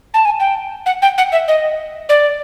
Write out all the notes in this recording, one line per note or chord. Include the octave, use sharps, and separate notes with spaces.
A5
G#5
G5
F#5
G5
F#5
E5
D#5
D5